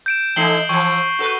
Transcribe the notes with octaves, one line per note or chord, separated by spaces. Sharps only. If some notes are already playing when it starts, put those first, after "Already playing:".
G6 D7 E7
E3 A3 D#4 C7 F#7 G7
E3 F3 C#6
F#4 A4 B4